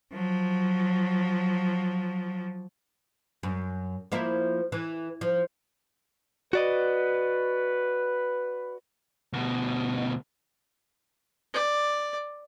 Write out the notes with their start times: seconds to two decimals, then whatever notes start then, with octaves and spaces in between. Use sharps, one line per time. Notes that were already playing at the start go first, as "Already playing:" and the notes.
0.13 F3 F#3
3.43 F#2
4.12 F3 A#3 E4
4.72 E3
5.21 F3
6.53 F#4 B4 D5 D#5
9.33 D2 B2
11.54 D5